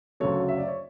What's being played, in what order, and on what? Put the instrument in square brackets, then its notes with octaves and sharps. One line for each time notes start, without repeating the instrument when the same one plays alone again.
[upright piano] D2 C#3 F#3 A4 C#5
E5
D5
C#5